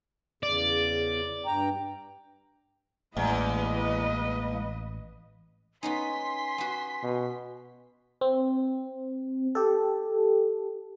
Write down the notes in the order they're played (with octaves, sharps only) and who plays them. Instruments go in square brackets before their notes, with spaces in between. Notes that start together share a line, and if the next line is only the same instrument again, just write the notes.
[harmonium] E2 C#3 [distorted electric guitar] D5
[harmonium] G2 G5 A#5
[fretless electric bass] A1 [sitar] E2 [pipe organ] G#3 A#3 [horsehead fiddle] B4 D#5
[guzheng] B3 C#4 D#4 [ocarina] G#5 [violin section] C6 B6
[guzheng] B3 F#4
[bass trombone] B2
[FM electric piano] C4
G4 A4